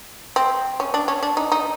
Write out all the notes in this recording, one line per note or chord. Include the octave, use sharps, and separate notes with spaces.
C4
C#4
D4
C#4
D4
D#4
D#4